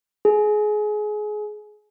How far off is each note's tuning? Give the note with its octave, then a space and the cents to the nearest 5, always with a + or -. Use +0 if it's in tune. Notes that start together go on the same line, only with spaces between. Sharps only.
G#4 +25